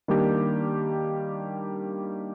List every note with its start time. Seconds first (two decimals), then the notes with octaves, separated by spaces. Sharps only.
0.08 D#3 G3 A#3 D4 G4